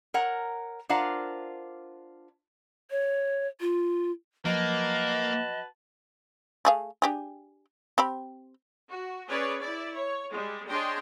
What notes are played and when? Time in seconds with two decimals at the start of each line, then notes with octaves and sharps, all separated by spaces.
0.14 A#4 C#5 F#5 A#5
0.89 D4 F4 A#4 C5 F5 F#5
2.91 C#5
3.60 F4
4.45 F3 F#3 A#3 F#4 B4 D#5 A5
6.65 A3 G#4 F5
7.02 D4 G4 G#4
7.98 C4 G4 B5
8.88 F#4
9.28 C#4 G#4 B4 C#5 D5
9.59 E4 D5
9.95 C#5
10.31 G3 G#3
10.69 D4 G#4 C#5 D#5 G5 C6